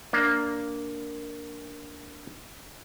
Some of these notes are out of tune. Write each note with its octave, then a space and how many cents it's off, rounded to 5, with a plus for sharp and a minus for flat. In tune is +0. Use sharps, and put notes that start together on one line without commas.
A#3 +0 D4 -10